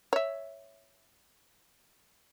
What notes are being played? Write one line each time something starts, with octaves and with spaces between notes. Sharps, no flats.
C#5 E5